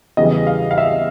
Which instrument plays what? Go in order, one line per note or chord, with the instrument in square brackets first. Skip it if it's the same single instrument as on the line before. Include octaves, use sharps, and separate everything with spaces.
[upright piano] E2 C#3 E3 G3 D#5
F5
F5
E5